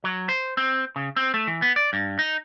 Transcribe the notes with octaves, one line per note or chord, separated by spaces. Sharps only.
F#3
C5
C4
C#3
C4
A3
E3
B3
D5
G2
D#4